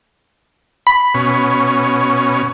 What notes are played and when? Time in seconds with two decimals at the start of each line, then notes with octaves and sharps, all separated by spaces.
0.87 B5
1.15 B2 C#4